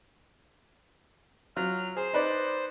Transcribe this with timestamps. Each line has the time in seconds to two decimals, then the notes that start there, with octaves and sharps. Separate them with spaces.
1.56 F#3 F4 F6
1.97 G#4 C5
2.13 D#4 B4 D5